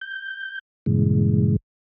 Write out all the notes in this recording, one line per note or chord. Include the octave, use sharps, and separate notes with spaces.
G6
G2 A#2 C#3 E3 G#3